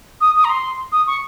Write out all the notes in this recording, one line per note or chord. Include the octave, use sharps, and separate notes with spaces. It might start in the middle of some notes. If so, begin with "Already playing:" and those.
D#6
D#6
A#5
C6
D#6
C#6